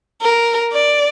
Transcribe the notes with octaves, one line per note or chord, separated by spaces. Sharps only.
A#4
D5